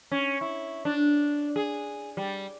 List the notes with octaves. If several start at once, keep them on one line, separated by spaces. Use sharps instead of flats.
C#4
E4
D4
G#4
G3